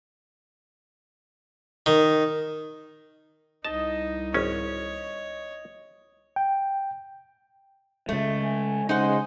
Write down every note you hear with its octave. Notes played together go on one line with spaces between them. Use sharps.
D#3
C2 D#4 D#5 A5
G#1 C#4 C#5
G5
C#3 G#3 A3
G#5
C#3 G#3 D#4 C5 F#5